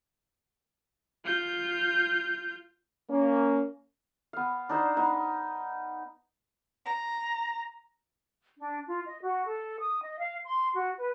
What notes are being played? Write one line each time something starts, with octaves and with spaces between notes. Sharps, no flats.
F4 G6
A#3 C#4
B3 F5
D4 D#4 C5
B3 D#4
A#5
D4
F4
D#5
F#4
A4
D#6
D#5
F5
C6
F#4
B4